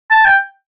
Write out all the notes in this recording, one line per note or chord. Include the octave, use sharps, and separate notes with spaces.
A5
G5